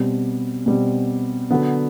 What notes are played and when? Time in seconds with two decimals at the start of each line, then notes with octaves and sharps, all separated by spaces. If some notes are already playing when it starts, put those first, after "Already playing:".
Already playing: B2 G3 C4
0.66 B2 G3 C4
1.51 D3 F#3 B3